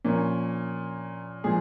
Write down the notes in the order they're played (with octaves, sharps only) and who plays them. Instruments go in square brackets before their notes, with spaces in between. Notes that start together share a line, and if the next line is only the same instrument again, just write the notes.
[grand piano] A#2 F3 A#3 C#4
A#2 F3 G#3 G#4